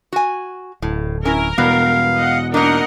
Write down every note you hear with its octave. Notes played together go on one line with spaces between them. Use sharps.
F#4 G#5
D1 A2
C#4 E4 A#4
E2 B2 G3 B3 B4 F5
D#5 F#5
A#3 D4 D#4 A#4 D#5 F#5